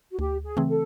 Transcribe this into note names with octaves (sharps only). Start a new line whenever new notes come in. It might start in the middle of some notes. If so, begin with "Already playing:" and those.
F#4
D2 G4
G#4
C#3 E3 A3 C4
A4